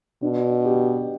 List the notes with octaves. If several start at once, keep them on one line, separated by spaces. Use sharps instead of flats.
B2 D4
G4